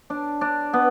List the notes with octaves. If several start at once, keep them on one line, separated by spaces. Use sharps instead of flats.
D4
D4
B3